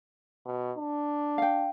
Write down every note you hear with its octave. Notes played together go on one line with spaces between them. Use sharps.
B2
D4
F5 G5